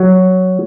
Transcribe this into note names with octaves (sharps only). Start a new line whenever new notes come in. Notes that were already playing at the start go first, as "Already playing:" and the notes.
Already playing: F#3